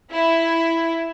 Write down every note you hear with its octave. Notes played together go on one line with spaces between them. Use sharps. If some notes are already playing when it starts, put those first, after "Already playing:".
E4